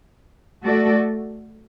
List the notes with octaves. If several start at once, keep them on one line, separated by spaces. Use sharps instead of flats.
A3 F#4 A4 D5